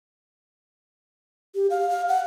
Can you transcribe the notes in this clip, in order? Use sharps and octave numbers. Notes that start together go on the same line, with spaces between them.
G4
F5
F5
F#5